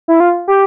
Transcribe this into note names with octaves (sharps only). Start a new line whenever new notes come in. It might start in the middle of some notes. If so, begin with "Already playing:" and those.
E4
F4
G4